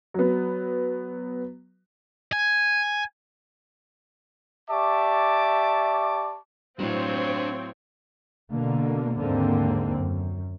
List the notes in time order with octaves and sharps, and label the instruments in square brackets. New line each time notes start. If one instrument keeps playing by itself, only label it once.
[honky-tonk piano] F#3 B3
[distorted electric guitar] G#5
[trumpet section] G4 D5 E5 A5 C#6 D6
[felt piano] A2 F#3 [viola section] C4 [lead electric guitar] D4 B4 [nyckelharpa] F4 C#5
[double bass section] B2 D3 A#3
D#2 G#2 D3 A#3 C4
F#2